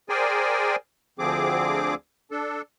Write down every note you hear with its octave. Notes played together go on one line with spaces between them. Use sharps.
G#4 A#4 C5 D5 G5 G#5
D2 D3 F3 C4 G#4 D6
D4 A4